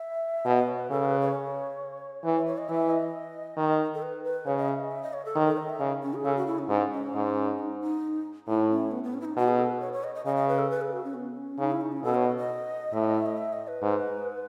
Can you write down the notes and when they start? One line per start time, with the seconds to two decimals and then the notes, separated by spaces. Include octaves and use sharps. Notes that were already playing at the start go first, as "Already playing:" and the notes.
Already playing: E5
0.46 B2 D#5
0.57 D#5
0.68 C#5
0.79 B4
0.90 C#3 A4
1.05 B4
1.21 C#5
2.24 E3 B4
2.36 C#5
2.46 C#5
2.58 D#5
2.69 E3 E5
2.90 D#5
3.57 D#3
3.94 A4
4.02 B4
4.24 B4
4.46 C#3 C#5
4.57 D#5
4.68 E5
4.80 D#5
4.91 E5
5.03 D#5
5.13 C#5
5.25 A4
5.35 D#3
5.47 A4
5.58 D#5
5.69 E5
5.80 C#3 D#5
6.02 C#4
6.14 G#4
6.24 C#3 A4
6.36 F#4
6.46 E4
6.59 C#4
6.69 G#2 C#4
6.91 C#4
7.14 G#2
7.59 D#4
7.81 D#4
8.47 A2 E4
8.70 C#4
8.91 B3
9.04 B3
9.14 C#4
9.21 E4
9.25 D#4
9.37 B2 F#4
9.48 G#4
9.59 A4
9.70 B4
9.81 C#5
9.93 C#5
10.04 D#5
10.15 D#5
10.26 C#3 D#5
10.36 D#5
10.48 B4
10.59 A4
10.70 B4
10.81 G#4
10.93 F#4
11.04 C#4
11.14 B3
11.36 C#4
11.59 C#3 D#4
11.71 E4
11.81 D#4
11.92 C#4
12.03 B2 A4
12.15 C#5
12.25 D#5
12.37 D#5
12.93 A2 E5
13.04 D#5
13.15 E5
13.26 D#5
13.38 E5
13.53 D#5
13.68 B4
13.82 G#2